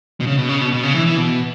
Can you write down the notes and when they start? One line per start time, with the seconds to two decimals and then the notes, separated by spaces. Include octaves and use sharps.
0.20 B2
0.27 C#3
0.38 B2
0.49 C#3
0.61 B2
0.72 B2
0.83 C#3
0.95 E3
1.06 E3
1.17 B2